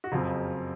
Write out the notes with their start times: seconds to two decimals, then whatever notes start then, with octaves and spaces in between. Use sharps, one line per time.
0.04 F#4
0.12 F#1 F2 C#3 F#3 C4 F4